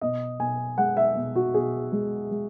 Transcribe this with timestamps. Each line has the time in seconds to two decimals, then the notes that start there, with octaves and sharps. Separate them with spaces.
0.01 B2 D#5
0.39 B2 G#5
0.78 G#3 F#5
0.97 E5
1.15 B2
1.36 F#4
1.54 B2 G#4
1.92 G#3
2.31 G#3